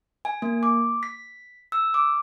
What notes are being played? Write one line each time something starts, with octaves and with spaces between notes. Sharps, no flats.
G#5
A#3
D6
B6
E6
D6